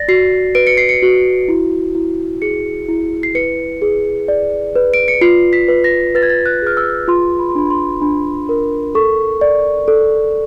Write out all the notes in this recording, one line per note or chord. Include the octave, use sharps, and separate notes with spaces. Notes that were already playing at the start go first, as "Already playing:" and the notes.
Already playing: D5 A6 A#6
F#4 C7
B4 D7
C#7
C7
C#7
F#4
E4
E4
G#4 C#7
E4
C7
B4 C#7
G#4
D5
B4
D7
C#7
F4 C7
B6
B4
A#6
B4 A6
G#6
A6
F#6
G#4 F6
E6
F4 C6
B5
C6
D4 B5
B5
C6
D4 B5
A#4
A4 C#6
D5
A4